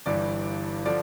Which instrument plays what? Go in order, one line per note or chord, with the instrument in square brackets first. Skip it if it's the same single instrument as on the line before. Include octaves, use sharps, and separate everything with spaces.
[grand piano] G1 G2 E3 G3 D5
D3 F3 D5